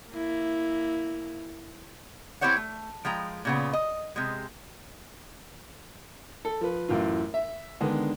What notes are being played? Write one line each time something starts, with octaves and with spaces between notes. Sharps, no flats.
A#3 E4
C4 E4 G4 C5 C#5 F#5
A3
F3 G#3 G5 A#5
A#2 C#3 B3
D#5
C3 G#3
A4
F3 B4
F#2 A2 E3 F4
E5
D3 D#3 G#3 B3 D4 G#4